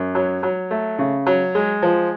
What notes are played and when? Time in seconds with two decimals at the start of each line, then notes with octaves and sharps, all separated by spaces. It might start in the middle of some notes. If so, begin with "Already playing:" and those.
Already playing: F#2
0.15 F#3
0.43 F#3
0.71 A3
0.99 C#3
1.26 F#3
1.55 G#3
1.82 F3